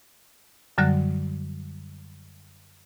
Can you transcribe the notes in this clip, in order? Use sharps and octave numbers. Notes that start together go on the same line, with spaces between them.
F#2 D3 F#3 G3 F#6